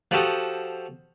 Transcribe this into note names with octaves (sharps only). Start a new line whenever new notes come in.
F3 F#4 G4 A4 D#6